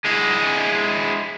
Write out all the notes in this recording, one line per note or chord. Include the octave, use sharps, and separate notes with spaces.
G#3 E4